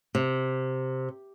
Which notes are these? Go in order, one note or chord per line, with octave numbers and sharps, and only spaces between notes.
C3